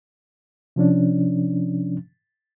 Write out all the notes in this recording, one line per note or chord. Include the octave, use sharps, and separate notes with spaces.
C3 F3 C#4 D4